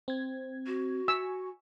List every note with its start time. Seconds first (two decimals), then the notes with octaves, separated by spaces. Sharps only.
0.08 C4 G#6
0.67 F#4
1.08 G#5 C#6 E6